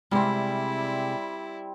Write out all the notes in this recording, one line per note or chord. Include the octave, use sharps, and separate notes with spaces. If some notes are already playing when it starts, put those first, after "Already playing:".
C3 G3 G#3 C4 E4 D5